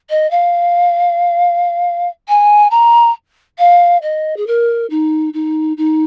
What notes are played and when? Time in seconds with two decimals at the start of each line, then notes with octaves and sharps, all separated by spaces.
0.09 D#5
0.30 F5
2.28 G#5
2.71 A#5
3.58 F5
4.02 D#5
4.36 G#4
4.46 A#4
4.90 D#4
5.33 D#4
5.77 D#4